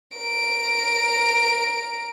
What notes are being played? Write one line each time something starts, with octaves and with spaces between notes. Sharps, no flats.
A#4 D7